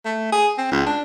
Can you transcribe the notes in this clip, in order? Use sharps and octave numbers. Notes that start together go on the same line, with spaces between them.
A3
G#4
C4
C#2
D4